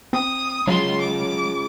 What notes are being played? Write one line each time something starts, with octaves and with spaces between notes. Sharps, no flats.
C4 D#6
F#3 C#4 F4 G#4 C6
D6